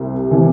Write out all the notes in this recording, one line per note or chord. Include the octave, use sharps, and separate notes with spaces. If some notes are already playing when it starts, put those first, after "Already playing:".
Already playing: C2 C3
C3 E3